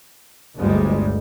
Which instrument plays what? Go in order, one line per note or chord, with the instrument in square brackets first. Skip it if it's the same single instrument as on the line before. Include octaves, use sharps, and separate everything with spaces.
[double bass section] G1 D2 G3 G#3